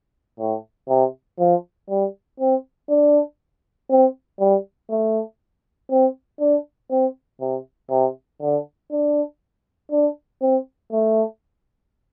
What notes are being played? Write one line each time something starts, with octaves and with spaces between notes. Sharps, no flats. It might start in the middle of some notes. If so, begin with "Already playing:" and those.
A2
C3
F3
G3
C4
D4
C4
G3
A3
C4
D4
C4
C3
C3
D3
D4
D4
C4
A3